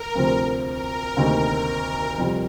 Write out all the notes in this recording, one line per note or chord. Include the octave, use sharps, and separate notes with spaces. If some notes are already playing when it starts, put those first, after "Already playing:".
Already playing: A#4
D2 C3 F3 C4
A#4
D2 C3 D#3 A#3 D#4
F2 C3 G3